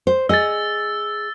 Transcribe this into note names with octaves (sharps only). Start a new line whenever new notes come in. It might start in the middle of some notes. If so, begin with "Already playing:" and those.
C5
G#4 D#5 E6 A6